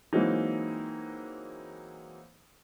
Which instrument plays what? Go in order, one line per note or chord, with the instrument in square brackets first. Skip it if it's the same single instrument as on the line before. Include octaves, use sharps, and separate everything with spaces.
[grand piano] E3 F#3 G#3 A#3 C4 D#4